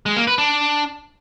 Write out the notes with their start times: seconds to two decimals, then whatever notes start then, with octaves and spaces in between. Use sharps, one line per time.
0.06 G#3
0.17 A#3
0.27 B4
0.38 D4